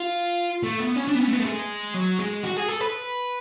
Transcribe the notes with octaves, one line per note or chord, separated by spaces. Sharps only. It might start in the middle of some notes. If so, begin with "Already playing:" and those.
Already playing: F4
A3
B3
C#4
D4
B3
C#4
A3
B3
A3
G#3
F#3
G#3
F#4
G#4
A4
B4